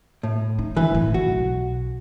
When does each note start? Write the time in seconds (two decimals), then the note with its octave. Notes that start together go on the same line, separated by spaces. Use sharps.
0.23 A2
0.59 D#4
0.77 D3 E3 A3 B4
0.95 G#1 A2
1.14 B1 F#4